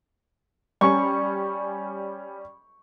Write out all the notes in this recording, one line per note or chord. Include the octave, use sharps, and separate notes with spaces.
G3 C#4 C#6